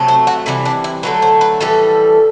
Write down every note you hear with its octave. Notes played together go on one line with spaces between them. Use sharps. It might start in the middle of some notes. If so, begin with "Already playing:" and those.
Already playing: C3 F#3 A3
C5
F#4
C3 E3 G3 E4
D4
E4
D3 F#3 A3 B4
C5
B4
A2 E3 G3 A4